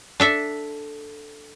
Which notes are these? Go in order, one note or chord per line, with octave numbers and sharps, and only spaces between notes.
D4 A4 E5